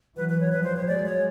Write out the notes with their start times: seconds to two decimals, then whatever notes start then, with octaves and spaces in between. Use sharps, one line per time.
0.17 E3 F#3 B4
0.29 B4
0.40 C#5
0.52 F3 G3 B4
0.63 C5
0.76 C#5
0.87 F#3 G#3 D5
1.06 C#5